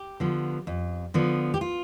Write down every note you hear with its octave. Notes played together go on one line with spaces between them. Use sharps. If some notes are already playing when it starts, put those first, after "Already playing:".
Already playing: G4
D3 F3 B3
F2
D3 F3 B3
G4
F4